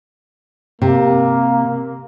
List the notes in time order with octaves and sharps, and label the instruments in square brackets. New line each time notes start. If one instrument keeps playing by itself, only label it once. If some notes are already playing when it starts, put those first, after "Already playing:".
[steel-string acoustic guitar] C3 [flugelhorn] A#3